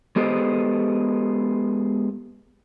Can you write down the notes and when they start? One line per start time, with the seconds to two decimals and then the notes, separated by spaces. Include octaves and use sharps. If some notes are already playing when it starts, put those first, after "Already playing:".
0.16 G#3 B3 G4 A4 C5 D#5